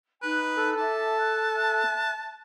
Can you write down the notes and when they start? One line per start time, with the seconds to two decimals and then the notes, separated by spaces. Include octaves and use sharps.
0.22 D#4 B4 G#5 F#6
0.57 A4
0.78 E5 G#5 A5 D6
1.18 F#6
1.54 E5 G#5 F#6